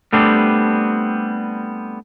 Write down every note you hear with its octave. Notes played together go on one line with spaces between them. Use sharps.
G3 A3 B3 C4 D4 G4